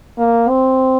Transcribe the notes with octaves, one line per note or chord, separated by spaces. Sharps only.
A#3
C4